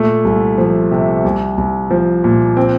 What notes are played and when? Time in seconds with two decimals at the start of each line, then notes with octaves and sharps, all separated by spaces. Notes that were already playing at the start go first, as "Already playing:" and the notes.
Already playing: A#2 A3
0.25 C2
0.58 F3
0.91 C3
1.24 C2
1.58 C2
1.91 F3
2.24 A#2
2.57 C4